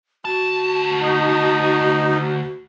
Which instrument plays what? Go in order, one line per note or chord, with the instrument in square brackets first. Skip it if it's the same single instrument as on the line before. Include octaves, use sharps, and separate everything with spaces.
[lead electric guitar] D2 A5 [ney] F#4
[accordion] D#4